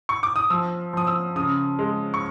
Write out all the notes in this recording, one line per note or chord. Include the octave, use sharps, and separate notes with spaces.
C#6
D6
D#6
F3 E6
F3 D#6
E6
C#3 D#6
G#3
C#6